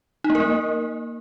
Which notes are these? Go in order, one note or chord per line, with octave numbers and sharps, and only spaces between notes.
D#4
A#3
A#4
A#3